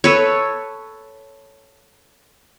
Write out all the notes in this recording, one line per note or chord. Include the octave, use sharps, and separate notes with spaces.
A4 B4 C#5